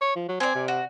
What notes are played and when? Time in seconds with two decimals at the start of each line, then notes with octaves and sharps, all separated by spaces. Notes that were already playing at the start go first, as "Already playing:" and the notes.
0.01 C#5
0.16 F3
0.29 F#3
0.40 C4 D5 G#5
0.55 C3
0.68 F#4